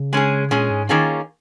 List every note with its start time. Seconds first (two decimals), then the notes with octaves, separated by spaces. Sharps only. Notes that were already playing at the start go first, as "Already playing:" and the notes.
Already playing: C#3
0.13 G#3 C#4 G#4
0.51 A#2 G#3 C#4 G#4
0.70 G#2
0.89 D#3 A#3 C#4 F4 G#4